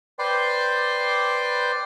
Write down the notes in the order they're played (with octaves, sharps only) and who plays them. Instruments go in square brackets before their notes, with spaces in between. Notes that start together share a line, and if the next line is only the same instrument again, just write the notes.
[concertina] B4 C5 D5 G5 C6